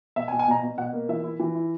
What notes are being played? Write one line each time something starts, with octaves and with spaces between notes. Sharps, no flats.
B2 E5
G#5
B2
G#5
B2 A#5
B2
B2 F#5
A#3
E3 E5
E4
E3
E4